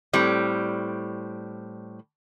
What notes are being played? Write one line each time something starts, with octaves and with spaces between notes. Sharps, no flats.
A2 G3 C4